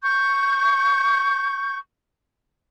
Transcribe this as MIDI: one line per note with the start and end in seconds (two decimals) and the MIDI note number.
0.03 1.78 85
0.03 1.78 91